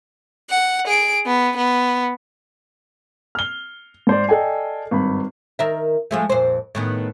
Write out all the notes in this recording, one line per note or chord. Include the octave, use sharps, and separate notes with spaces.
F#5
G#4 D7
B3
B3
F6 G7
G#2 C5 D5
A4 D5 D#5 G5 G#5
G#1 G2 B5
D#3 A#4 E5
F3 G#3 A3
F2 A#2 C5
A2 D#3 B3